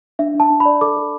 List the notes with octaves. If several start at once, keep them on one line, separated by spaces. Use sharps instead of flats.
D4 E5
D4
A5
D4
B5
D5
A4 D6
A4